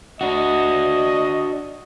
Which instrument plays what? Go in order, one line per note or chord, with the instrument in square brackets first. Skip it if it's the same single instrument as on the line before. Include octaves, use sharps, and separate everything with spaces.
[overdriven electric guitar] D4 F#4 [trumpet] D#5